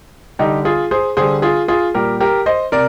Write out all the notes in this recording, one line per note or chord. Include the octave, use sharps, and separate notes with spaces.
D3 G3 D#4 G4
F4 G#4
G#4 C5
D3 G3 G#4 C5
F4 G#4
F4 G#4
A#2 G3 G4 A#4
G4 A#4
C5 D#5
C3 A#4 D5